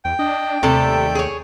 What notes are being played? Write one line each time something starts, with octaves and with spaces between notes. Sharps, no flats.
E2 G5
D4 D#5
D#2 C3 G3 A3 A4
G#4 C#5